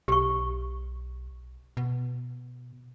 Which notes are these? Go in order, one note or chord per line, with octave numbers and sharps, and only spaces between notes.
B1 G4 C#6
B2